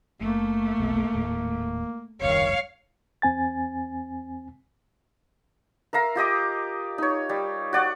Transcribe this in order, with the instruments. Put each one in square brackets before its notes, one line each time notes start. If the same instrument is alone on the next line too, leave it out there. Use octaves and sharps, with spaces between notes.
[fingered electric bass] F#1 [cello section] A3 [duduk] A#3
[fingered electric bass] F1 B1 B3
D#1 D#2 A2
[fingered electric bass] F1 C#2 G2 [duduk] D#3 [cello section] C#5 F5
[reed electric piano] E2 C4 G#5 A6
[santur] A#4 E5 F5 A#5
F4 G4 D#5 D6
D#4 C#5
G3
F#4 D5 F#5